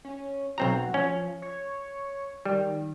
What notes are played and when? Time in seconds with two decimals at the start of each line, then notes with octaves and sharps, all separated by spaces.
0.05 C#4
0.58 B1 C4 F#4 A#5
0.94 F3 C#4
1.42 C#5
2.45 D#3 G3